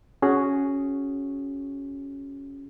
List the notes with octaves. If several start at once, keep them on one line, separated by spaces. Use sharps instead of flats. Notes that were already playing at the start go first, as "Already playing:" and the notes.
C#4 F#4 G#4